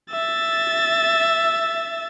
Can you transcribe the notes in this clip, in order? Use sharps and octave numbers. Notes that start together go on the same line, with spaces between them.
E5 A6